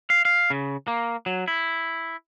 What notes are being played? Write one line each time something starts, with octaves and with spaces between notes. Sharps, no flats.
F5
F5
C#3
A#3
F#3
E4